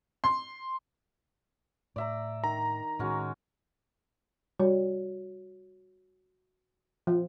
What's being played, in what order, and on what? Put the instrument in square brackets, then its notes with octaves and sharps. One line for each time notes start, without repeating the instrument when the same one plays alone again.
[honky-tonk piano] C6
[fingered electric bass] A2 [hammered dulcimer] D5 E5 A#5
[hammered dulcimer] D#3 [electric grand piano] A#5
[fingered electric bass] A2 D#3 [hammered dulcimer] G#3 C#4 F#4
[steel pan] G3 [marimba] F#4 C#5
[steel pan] F3